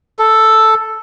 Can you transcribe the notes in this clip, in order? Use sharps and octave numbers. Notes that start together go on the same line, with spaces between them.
A4